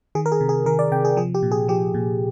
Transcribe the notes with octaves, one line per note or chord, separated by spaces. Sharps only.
D#3 G#4
A#4
G#4
C3
G#4
D#3 A#4
D5
C3 G5
G#4
F3 G#4
G4
A#2
G#4
F3 G4
A#2